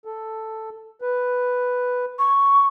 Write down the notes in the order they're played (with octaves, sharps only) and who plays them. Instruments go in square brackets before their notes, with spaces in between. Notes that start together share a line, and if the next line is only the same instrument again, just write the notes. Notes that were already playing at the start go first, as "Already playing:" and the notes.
[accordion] A4
B4
[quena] C#6